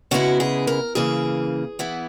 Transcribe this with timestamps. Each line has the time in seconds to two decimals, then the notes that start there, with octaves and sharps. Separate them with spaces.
0.11 C#3 G#3 B3 E4 F#4
0.40 G#4
0.67 A#4
0.95 C#3 E3 A#3 G#4
1.79 E3 B3 E4